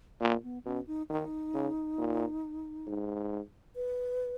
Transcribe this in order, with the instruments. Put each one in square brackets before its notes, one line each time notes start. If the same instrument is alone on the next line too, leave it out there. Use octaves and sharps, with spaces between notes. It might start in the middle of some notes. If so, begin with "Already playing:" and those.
[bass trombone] A#2 [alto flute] A#3
[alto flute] B3
[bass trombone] B2 [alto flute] C#4
[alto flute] D#4
[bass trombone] D#3 [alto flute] D#4
[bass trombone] C#3
A#2
G#2
[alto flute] B4